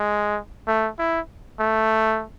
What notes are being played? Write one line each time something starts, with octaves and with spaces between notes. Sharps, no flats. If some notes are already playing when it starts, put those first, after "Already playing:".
Already playing: G#3
A3
E4
A3